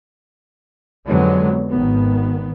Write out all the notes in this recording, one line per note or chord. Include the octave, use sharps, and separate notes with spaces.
F2 D3 F#3 G#3 B3
G#1 D#3 B3